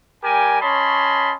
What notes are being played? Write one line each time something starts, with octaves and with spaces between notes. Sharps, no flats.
G3 G4 A#4 G#5
C#4 C#5 D#5 A5 B5 C6